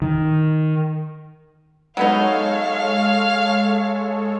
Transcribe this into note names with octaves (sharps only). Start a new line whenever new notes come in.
D#3
F#3 G#3 B3 D#4 A4 C#5 F5